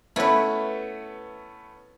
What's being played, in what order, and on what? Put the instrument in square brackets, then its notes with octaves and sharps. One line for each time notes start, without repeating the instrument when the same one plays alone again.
[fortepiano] A3 B3 C#4 [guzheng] E4 B4